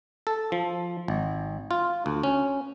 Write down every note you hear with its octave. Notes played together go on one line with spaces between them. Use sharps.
A4
F3
G#1
F4
D2
C#4